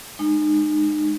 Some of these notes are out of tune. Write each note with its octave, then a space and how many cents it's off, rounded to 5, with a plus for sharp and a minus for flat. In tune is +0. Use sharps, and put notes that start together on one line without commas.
G#3 +0 D#4 -35